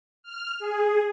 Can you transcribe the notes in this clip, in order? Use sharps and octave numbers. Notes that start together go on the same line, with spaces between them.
F6
G#4